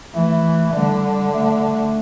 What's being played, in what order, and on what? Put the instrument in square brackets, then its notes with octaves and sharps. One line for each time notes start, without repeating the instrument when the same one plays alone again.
[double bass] E3 [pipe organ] A3
[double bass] D3 [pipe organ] G3
[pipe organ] A3